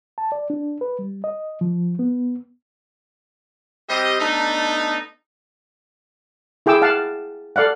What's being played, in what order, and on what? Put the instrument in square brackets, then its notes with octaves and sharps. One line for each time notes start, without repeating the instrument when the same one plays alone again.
[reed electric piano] A5
D5
D4
B4
G3
D#5
F3
B3
[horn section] G3 C4 G4 C5 D#5
A3 B3 D4 D#4
[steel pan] E4 G#4 G5 D6 E6
F5 F#5 A5
A4 D5 F5 F#5